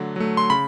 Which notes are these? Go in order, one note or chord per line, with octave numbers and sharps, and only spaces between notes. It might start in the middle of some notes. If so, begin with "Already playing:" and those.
Already playing: D3 F#3 A3
F#3 A3
C6
C#3 B5